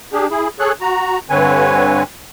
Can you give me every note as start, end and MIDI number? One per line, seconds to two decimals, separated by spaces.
0.13 0.27 62
0.13 0.27 67
0.13 0.27 68
0.31 0.48 64
0.31 0.48 68
0.59 0.72 68
0.59 0.72 69
0.59 0.72 73
0.59 0.72 90
0.81 1.19 66
0.81 1.19 82
1.30 2.03 43
1.30 2.03 50
1.30 2.03 60
1.30 2.03 71
1.30 2.03 73
1.30 2.03 80